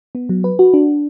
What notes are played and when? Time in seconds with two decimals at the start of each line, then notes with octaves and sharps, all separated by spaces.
0.15 B3
0.29 F#3
0.44 B4
0.59 F#4
0.74 D4